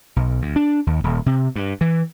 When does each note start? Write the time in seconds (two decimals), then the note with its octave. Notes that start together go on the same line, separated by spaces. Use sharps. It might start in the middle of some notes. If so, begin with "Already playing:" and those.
0.16 B1
0.42 D2
0.56 D4
0.87 D#2
1.04 D#1
1.26 C3
1.56 G2
1.81 E3